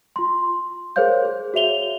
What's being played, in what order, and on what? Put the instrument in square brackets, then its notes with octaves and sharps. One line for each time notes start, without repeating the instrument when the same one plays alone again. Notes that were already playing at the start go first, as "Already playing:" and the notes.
[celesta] F4 C6
G#4 A#4 C5 C#5 F5 G6
G#4
F#4 C#5 E5 F7 G7